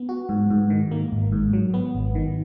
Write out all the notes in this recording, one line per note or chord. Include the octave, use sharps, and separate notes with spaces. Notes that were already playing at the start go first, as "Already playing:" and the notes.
Already playing: B3
F#4
G#2
G#2
D#3
A#3
G#1
G#2
F#3
B3
G#1
D#3